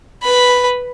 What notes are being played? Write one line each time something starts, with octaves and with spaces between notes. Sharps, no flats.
B4 B5